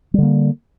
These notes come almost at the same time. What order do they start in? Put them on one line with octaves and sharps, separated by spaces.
G3 D3 A#3